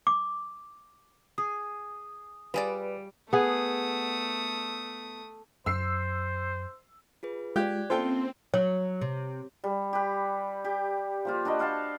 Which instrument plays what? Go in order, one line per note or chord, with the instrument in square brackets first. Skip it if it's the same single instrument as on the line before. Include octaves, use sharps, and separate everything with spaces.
[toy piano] D6
[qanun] G#4 [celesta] D#6
[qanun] G3 [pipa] F4 G#4 D5 [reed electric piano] B4
[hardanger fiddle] A3 D#6 [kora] B3 G#4
[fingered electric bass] F#2 [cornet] C5 [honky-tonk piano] E6 C7
[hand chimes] F4 G#4 B4
[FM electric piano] G#3 F4 [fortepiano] G4 [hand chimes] D5 F#6 G#6
[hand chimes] A#3 C#4 C6 [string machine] C4 [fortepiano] F4 A4 G5 [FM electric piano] C5
[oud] F#3 [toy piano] C#5
[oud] C3
[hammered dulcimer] G3
G4 B4
G4
F3 A#3 F4
D4 F#4 B4 D#5
C5 F5 F#5 A5